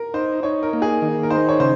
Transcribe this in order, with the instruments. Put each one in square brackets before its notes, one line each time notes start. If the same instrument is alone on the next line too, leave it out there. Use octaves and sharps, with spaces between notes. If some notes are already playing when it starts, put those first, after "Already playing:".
Already playing: [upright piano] A#4
[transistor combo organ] D#4 [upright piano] C5
[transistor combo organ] D#4 [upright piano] C#5
[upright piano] A#4
[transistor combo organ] A#3
[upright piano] G#4
[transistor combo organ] D#3
[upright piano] A#4
[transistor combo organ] D#4 [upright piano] C5
[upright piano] C#5
[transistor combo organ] C#3 [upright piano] C5